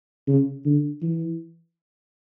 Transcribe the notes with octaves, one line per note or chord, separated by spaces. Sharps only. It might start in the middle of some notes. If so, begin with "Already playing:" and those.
C#3
D3
E3